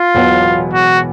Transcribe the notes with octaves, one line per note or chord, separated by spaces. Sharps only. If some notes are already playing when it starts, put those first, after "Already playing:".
Already playing: F4
E1 E2 B2 F#3 B3
F#4